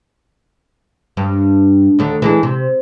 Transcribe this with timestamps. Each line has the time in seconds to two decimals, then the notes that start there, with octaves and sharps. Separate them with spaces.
1.17 G2
1.99 D#2 D3 A3
2.22 E3 G#3 D4
2.43 C3